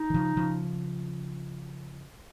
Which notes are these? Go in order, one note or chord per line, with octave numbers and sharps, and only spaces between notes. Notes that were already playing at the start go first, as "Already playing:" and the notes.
Already playing: D#4
D#3
C#3 F3
C#3 F3